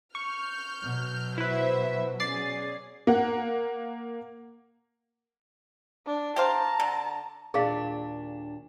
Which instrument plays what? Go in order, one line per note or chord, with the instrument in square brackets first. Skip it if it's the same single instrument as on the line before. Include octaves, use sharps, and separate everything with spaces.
[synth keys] C#6 [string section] F6 G6
[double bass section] B2 F#3
[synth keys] E4 B4 [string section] C5 E5
[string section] C#4 G#4 [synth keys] D5 A6 C7
[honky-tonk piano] A#3 F#5
[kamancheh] D4
[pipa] G4 C5 F5 [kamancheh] A5 A#5
[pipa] D3
[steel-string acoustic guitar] D#2 A#2 D4 [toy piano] G#4 F5